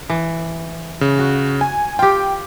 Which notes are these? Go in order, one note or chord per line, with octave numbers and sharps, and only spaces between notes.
E3
C#3
F#4
G#5
F4 G4 G5